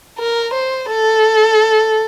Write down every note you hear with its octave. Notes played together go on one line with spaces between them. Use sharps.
A#4
C5
A4